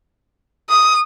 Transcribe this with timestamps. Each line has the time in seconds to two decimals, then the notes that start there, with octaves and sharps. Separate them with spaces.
0.69 D#6